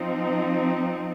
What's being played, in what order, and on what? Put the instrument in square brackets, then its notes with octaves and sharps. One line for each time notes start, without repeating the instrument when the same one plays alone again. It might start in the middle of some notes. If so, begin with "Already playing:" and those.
Already playing: [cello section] F3 C4 D#4